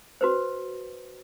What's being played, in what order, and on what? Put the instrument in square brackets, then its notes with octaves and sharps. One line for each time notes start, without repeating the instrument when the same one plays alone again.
[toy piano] F#4 B4 C5